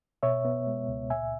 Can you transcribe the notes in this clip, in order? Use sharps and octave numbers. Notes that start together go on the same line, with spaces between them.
B2 C#5 E5
B3
G#3
C#2
A#2 E5 G#5